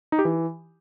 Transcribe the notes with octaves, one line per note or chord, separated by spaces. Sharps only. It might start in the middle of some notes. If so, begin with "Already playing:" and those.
D#4
G4
E3